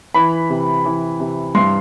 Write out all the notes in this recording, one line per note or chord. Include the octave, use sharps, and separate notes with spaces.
E3 B5
C3
E3
C3
G2 C6